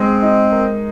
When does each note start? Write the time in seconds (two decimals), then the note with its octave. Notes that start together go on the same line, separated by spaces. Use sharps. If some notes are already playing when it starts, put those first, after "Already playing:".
Already playing: G#3 C4 D#4
0.22 D#4
0.52 A#4